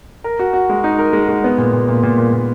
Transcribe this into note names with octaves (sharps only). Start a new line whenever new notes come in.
A#4
F#4
F#4
G#3
D#4
A#4
G#3
G#3
B3
A#2
A#2
A#2
A#2
A#2
A#2